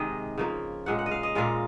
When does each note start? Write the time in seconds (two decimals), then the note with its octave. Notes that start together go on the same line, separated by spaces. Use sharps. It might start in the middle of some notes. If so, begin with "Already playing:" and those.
Already playing: C3 D#3 G#3 D#5
0.38 C#3 F3 A#3
0.86 A#2 G#3 F#5
0.99 F#5
1.06 D#5
1.11 F5
1.23 D#5
1.35 A#2 G#3 F4